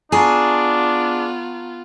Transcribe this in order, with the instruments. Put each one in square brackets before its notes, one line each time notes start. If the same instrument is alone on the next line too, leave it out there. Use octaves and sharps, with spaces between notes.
[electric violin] B3 F4 [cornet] D4 [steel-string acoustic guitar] G#4 [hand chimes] A5 A#5 C#6